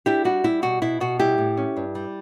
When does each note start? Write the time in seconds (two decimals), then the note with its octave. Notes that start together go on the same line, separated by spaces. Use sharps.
0.06 D4 E4 G4
0.25 G3 F#4
0.44 G3 E4
0.62 B2 F#4
0.82 B2 E4
1.00 B2 F#4
1.19 G3 E4 G4
1.38 A2
1.57 C#4
1.77 G2
1.95 G3